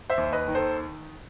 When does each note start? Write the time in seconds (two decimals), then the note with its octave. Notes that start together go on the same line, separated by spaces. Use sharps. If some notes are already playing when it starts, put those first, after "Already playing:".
0.10 C5 E5
0.18 D#2
0.33 B4 D#5
0.48 D#3
0.55 A4 C5